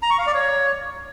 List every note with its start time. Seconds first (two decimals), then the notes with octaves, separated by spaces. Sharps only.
0.03 A#5
0.10 C#6
0.18 F5
0.26 D5
0.34 C#5